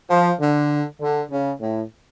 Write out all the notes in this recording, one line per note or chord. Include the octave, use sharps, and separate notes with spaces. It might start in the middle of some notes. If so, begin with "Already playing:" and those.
F3
D3
D3
C#3
A2